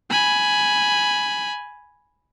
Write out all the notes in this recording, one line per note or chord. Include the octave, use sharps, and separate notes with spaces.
G#5 B5